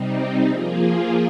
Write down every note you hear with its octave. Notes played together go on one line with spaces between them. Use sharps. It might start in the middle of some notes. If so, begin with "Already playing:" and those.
Already playing: C3 G3 C4 D#4
F3 A#3 F4 G#4